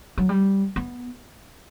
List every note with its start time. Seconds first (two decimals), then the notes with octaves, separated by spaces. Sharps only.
0.18 F#3
0.29 G3
0.76 B3